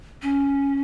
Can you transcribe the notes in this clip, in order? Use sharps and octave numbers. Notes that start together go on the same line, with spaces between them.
C#4